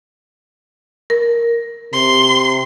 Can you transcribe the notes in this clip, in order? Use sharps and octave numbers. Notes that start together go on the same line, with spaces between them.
A#4
C3 C6